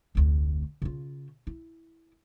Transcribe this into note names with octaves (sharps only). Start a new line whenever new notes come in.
F1 D2
C#3 F4
E4